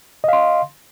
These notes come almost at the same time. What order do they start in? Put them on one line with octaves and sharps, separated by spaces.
D#5 F5 C6